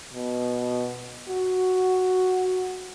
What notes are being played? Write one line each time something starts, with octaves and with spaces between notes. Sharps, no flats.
B2
F#4